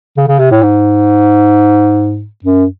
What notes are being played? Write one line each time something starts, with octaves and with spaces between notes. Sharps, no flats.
C#3
C#3
C3
A2
G#2
F#2